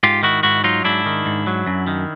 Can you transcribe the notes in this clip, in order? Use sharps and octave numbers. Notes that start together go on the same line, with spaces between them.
G#2 F4 G4
D#3 E4 F#4
G#2 E4 F#4
F#3 D#4 F4
G#2 D4 E4
D#3
G#2
F#3
F#2
D#3